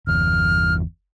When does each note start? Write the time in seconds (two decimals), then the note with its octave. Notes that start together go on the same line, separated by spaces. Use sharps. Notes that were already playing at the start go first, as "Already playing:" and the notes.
0.07 G1 E2 F6